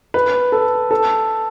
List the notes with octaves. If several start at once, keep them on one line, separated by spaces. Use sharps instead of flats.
B4
A4
A4